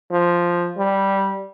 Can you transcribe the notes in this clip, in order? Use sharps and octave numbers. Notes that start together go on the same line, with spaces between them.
F3
G3